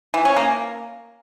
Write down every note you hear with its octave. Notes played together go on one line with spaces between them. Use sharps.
E3
C#4
A#3